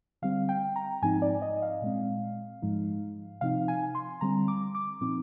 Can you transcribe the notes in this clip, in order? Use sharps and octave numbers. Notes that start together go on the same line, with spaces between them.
D3 G3 C4 F5
G5
A#5
G#2 F3 C4 D#4 G#5
D5
D#5
F5
A#2 G#3 C4
G#2 F3 G#3 D#4
C3 F3 C4 D#4 F5
G#5
C6
D3 G3 C4 A#5
D6
D6
A#2 F3 C4 D#4 D6